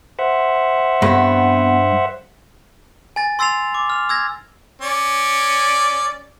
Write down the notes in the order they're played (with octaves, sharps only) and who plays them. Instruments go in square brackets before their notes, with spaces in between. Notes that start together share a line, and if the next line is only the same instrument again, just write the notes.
[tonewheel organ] C5 E5 F#5
[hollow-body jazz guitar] G2 [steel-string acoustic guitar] A3 B3 C4
[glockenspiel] G#5 A6
C6 E6 A6 C7 F7
D6
F6 F7
E6 G#6 A#6
[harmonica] C#4 D5